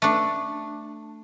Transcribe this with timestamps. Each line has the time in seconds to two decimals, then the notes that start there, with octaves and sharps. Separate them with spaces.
0.02 A3 D4